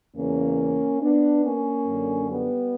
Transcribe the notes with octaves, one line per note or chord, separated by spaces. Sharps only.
E2 C#3 E3 A#3 C#4
B3 D4
A#3 C#4
F#2 D3
G3 B3